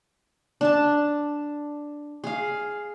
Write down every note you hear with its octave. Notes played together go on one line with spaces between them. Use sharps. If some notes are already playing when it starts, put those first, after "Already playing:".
D4 A5
G#4 F5